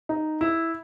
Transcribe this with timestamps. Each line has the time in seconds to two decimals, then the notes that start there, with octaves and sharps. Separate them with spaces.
0.09 D#4
0.41 E4